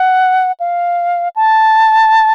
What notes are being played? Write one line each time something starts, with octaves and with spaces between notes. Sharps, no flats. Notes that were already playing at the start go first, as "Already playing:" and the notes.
Already playing: F#5
F5
A5